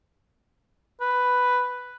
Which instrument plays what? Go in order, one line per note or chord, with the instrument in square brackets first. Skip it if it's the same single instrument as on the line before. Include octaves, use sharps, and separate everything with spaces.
[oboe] B4